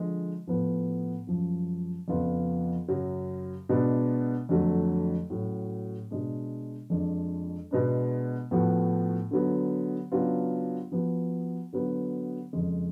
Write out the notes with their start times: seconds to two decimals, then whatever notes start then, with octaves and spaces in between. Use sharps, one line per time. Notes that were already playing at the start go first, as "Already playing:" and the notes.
Already playing: D3 F3 G#3
0.48 A2 F3 B3
1.27 F#2 F3 G#3
2.08 F2 C#3 F3 B3 F4
2.88 F#2 C#3 F#3
3.69 B2 G#3 B3 D4
4.49 F2 D3 F#3 A3
5.30 A2 F#3 C#4 F#4
6.10 B2 G#3 D4
6.90 F2 F3 G#3 D4
7.71 B2 G#3 B3 D4
8.51 A2 F3 B3 F#4
9.31 D3 F#3 B3
10.12 C#3 F#3 B3 D4 F4
10.92 F3 B3 F#4
11.73 D3 F#3 B3 F#4
12.53 F2 C#3 G#3